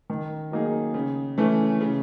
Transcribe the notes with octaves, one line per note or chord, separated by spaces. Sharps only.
D#3
F#3 A#3 D#4 G#4
C#3
E3 A3 C#4
C#3